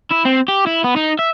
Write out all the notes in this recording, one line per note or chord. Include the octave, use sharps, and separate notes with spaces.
E4
C4
G4
E4
B3
D#4
E5